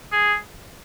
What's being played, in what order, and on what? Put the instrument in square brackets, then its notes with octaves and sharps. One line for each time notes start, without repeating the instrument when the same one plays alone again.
[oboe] G#4